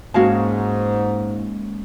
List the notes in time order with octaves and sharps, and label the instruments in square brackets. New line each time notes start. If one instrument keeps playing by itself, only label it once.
[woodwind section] G#2 [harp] G#3 A#3 C#4 [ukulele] F#4 F5 A5